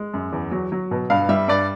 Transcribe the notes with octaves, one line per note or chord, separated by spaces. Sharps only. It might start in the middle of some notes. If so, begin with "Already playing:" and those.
Already playing: G#3
F#2
E2
F#3
F#3
B2
G2 F5
G3 E5
G2 D5